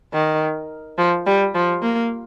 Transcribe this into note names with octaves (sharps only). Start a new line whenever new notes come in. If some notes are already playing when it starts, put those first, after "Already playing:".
D#3
F3
G3
F3
A#3